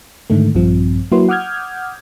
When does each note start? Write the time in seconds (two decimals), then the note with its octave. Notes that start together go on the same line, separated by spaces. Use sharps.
0.30 G#2 D3 D#3 A3
0.55 A#1 G2 F3 C4
1.12 F#3 A#3 E4 F#4 B4 C6
1.29 F#5 D6 D#6 F6 G6 G#6